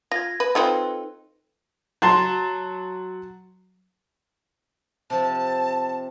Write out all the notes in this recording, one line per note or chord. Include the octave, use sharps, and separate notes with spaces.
F4 G#6 A#6
B4
C4 D#4 F4 A4 B4
F#3 F#4 A5 C6
C3 F3 A5